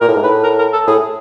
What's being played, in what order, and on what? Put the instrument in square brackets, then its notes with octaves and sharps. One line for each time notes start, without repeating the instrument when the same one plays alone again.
[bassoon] A#2 [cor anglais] A#4
[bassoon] A2
G#2
[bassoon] A2 [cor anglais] B4
[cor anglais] A#4
A#4
A4
[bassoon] A2 [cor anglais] G#4